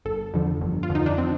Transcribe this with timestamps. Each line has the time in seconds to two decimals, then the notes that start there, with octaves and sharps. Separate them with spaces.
0.05 G1 A4
0.34 F2 D3 F3
0.61 G1
0.83 F4
0.89 F2 D3 F3
0.95 D#4
1.06 D4
1.18 C4